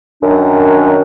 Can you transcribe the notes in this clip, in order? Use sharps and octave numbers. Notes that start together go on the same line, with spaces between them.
F#2 D#3 D4